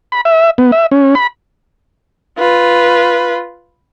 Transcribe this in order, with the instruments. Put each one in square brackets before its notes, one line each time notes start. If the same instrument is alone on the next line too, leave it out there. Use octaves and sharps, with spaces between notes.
[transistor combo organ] B5
E5
B3
E5
C#4
B5
[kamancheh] F4 B4